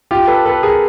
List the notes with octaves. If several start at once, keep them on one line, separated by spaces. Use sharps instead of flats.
F4 G4
A4 B4
A4 B4
G#4 A#4